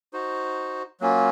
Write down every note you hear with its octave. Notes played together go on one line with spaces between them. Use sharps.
D#4 F#4 C5
F#3 A#3 C#4 F4